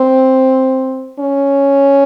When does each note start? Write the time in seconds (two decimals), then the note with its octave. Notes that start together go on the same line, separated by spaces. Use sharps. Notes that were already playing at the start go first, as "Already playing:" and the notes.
Already playing: C4
1.19 C#4